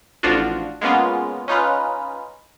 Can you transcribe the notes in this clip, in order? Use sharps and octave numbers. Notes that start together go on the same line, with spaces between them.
A1 D3 F3 D4 F4 F#4
G#3 A#3 B3 C#4 F4
C#4 D#4 F4 B4